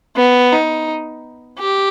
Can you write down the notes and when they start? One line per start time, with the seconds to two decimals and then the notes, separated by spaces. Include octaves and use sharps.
0.17 B3
0.53 D#4
1.59 G4